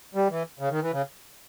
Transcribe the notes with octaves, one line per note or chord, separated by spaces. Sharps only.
G3
E3
C#3
D#3
E3
C#3